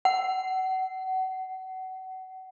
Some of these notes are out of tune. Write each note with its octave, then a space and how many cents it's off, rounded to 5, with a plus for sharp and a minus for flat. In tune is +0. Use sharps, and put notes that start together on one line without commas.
F#5 +30